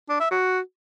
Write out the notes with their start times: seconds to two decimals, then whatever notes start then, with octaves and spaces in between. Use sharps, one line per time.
0.09 D4
0.20 E5
0.31 F#4